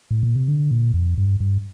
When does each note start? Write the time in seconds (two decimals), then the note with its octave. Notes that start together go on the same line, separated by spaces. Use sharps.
0.11 A2
0.23 A#2
0.36 C3
0.48 D3
0.71 A#2
0.94 F2
1.18 G2
1.40 G2